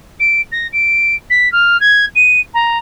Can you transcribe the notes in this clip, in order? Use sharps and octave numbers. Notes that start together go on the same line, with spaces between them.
D7
A#6
D7
B6
F6
G#6
D#7
A#5